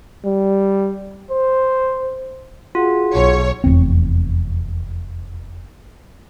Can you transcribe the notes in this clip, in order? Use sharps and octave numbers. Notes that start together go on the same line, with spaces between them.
G3
C5
F4 F#4 G#4 F#5
B1 C#5
F1 E2 C4